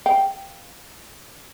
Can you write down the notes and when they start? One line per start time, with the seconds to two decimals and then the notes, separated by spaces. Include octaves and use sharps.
0.06 F5 G5